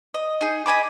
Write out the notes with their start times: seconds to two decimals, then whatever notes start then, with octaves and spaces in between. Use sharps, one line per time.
0.14 D#5
0.41 D#4 G#4
0.66 D#5 G#5 B5 D6